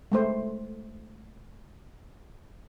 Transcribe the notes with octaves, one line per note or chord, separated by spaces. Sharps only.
G#3 A3 C5